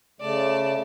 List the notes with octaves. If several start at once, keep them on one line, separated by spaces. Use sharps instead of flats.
C#3 A3 D5 A5